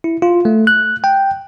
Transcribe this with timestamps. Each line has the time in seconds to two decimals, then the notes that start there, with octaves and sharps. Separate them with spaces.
0.04 E4
0.22 F4
0.45 A3
0.67 F#6
1.04 G5